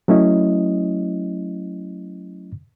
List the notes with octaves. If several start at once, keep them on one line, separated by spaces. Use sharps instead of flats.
F#3 A3 C#4 E4 D#5